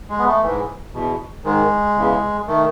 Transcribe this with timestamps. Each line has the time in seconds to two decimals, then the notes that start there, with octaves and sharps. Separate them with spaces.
0.09 G#3
0.19 B3
0.26 A3
0.43 G#2 E3
0.94 E2 B2
1.44 G#2 D#3 G#3
1.96 E2 C#3 E3
2.47 D#3 A3